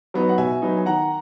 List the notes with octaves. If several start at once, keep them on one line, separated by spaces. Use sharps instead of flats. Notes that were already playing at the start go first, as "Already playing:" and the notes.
F#3 B3 D#4
F#5
B2 E5 G#5
F#3 B3 D#4
G#5
D#3 F#5 A#5